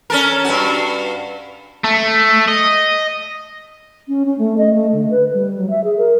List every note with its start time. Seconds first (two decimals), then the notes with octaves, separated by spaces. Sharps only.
0.10 C#4 A4 A#4
0.45 G2 F#4
1.84 A3
2.48 D#5
4.08 C#4
4.25 C#4
4.38 A3
4.57 D#5
4.73 A3
4.92 D3
5.10 B4
5.33 G3
5.56 F#3
5.69 E5
5.83 G#4
5.97 A#4